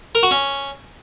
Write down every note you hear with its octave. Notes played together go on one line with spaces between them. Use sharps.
A#4
F#4
C#4